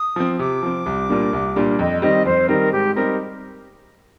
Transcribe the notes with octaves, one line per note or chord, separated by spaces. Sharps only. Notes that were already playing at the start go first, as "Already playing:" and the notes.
Already playing: D#6
F3 C4
C3 D6
F3 C4
C2
A#2 G3 A#3 D4
C2
A#2 G3 A#3 D4
F2 D#5
D#3 G3 C4 D#5
F2 C5
D#3 G3 C4 A#4
G#2 G4
G3 C4 D#4 G4 A#4